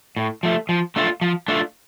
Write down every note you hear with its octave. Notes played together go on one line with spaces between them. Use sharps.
A2
F3 A3
F3
A3 D4 F4
F3
A3 D4 F4